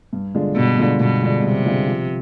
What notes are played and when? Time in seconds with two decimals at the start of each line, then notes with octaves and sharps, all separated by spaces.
0.13 G2
0.35 D3 G#3 D4 F4
0.55 G2 B2
0.78 D3 G#3 D4 F4
1.00 G2 B2
1.21 D3 G#3 D4 F4
1.43 G2 C3
1.65 D3 G#3 D4 F4
1.87 F3